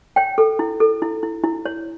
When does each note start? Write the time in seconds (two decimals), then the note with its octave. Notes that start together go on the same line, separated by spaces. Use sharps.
0.16 C#5 G5
0.38 A4
0.59 E4
0.80 A4
1.02 E4
1.23 E4
1.44 E4
1.66 C#5